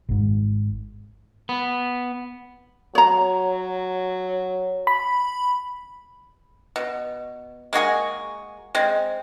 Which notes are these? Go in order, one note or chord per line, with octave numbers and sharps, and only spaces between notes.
G#1 G#2
B3
F#3 C#5 A#5
B5
B2
G#3 A#3 F#4 G#4
G#3 C4